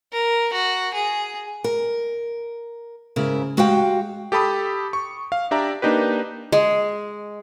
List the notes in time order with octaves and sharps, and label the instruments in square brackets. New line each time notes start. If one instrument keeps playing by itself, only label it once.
[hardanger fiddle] A#4
F#4
G#4
[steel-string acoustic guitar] A#4
G#2 C#3 E4 A#4
G#3 F#4 G4 F5 G5
[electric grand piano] G4 A4 A5 B5 D#6
C#6
F5
D4 G4 D5 E5 A#5
A#3 D4 D#4 G4 B4
[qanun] G#3